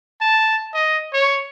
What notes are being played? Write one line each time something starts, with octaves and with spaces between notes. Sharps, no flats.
A5
D#5
C#5